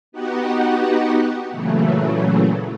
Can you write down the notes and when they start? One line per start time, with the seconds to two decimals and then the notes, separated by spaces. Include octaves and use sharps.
0.12 B3 D#4 F#4 G4 F#5
1.49 A#2 C#3 E3 F#3 A3